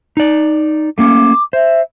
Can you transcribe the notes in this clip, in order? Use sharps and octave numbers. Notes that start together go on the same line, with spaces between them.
D#4 D5
A3 A#3 C#4 D6
C5 E5